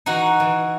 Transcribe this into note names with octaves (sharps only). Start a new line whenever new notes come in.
E3 D#4 F#4
E3